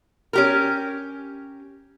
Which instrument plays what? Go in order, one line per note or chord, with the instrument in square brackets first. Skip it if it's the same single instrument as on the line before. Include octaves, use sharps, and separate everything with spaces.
[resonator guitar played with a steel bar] C#4 G4 A#4